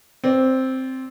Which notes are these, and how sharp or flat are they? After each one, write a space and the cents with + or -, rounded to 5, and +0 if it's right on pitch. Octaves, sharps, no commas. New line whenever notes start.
C4 +0 D5 -25